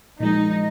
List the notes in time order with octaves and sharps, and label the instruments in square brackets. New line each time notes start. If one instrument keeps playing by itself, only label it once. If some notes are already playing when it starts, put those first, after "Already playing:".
[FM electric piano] A#2 F3 G#3 [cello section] D#4